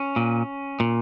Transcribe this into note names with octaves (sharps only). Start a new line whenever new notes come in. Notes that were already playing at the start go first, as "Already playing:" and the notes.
Already playing: C#4
A#2
A#2